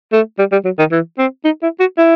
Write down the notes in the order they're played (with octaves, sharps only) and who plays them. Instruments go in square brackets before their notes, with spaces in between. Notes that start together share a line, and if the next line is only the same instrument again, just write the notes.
[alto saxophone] A3
G3
G3
F#3
D#3
E3
C4
D#4
E4
F#4
E4